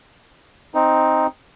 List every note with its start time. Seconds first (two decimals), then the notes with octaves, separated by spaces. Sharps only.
0.75 C4 D#4